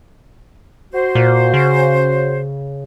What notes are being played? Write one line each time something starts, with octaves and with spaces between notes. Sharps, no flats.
F#4 C5
A#2
C#3